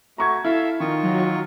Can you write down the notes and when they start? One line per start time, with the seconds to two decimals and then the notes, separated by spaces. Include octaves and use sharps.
0.18 A3 F#4 A#5 C#6 G#6
0.45 E4 A4 E5 F5
0.80 D#3 D#4 F4 C#6
1.03 F#3